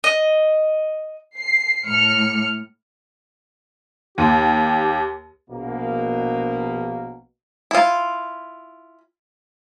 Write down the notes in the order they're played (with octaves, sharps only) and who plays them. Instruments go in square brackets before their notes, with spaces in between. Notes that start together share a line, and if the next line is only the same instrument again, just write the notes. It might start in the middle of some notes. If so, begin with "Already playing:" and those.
[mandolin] D#5
[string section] C7
A2 F6 C#7
[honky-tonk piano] D#2 [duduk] G4
[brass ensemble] A#1 B2 A#3
[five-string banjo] E4 F4